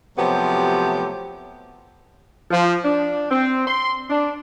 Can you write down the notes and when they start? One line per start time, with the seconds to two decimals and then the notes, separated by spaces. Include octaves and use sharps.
0.18 C3 F3 F#3 A3 B3 G4
2.51 F3
2.84 D4
3.31 C4
3.67 C6
4.10 D4